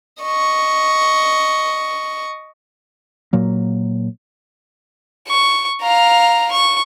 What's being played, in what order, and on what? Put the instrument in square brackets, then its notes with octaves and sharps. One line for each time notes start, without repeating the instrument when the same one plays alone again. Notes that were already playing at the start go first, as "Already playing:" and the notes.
[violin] D#5 C#6
[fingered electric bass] A#2 F#3 A#3
[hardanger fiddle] C#6
F5 A#5
C#6